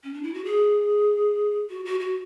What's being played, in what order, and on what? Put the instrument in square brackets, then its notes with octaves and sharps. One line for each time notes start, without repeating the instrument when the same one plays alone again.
[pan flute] C#4
D4
E4
F#4
G#4
F#4
F#4
F#4